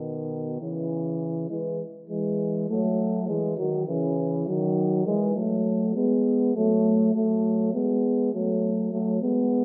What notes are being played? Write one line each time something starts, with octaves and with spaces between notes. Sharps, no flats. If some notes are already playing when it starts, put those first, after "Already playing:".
Already playing: B2 D#3
C#3 E3
E3 G#3
E3 G#3
F#3 A3
E3 G#3
D#3 F#3
C#3 E3
D#3 F#3
E3 G#3
F#3 A3
G#3 B3
F#3 A3
F#3 A3
G#3 B3
F#3 A3
F#3 A3
G#3 B3